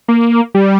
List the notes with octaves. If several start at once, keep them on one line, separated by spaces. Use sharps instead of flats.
A#3
G3